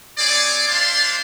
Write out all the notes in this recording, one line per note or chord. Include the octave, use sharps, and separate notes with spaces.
C4 G#4 C#5 D5
G#3 D4 C5 D5 F5 C6